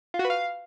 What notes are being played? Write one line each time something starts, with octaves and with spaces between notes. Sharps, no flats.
F4
F#4
B4
F5